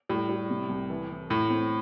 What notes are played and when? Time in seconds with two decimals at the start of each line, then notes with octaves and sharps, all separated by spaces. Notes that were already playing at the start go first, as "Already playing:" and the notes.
0.09 A2 G3
0.29 G3
0.50 C3
0.70 C2
0.90 E3
1.11 E3
1.30 A2 A3
1.50 C4